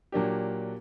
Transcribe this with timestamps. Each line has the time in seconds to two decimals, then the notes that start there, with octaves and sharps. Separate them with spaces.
0.12 A#2 F#3 A#3 D4 G4